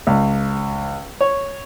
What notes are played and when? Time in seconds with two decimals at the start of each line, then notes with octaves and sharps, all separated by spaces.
0.07 C#2
1.21 C#5